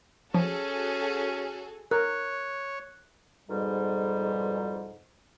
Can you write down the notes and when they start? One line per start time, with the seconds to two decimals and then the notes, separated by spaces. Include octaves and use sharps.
0.35 F3 C#4 F#4 G#4 A4
1.91 A#4 C#5 F#6
3.49 F2 G#2 B2 G3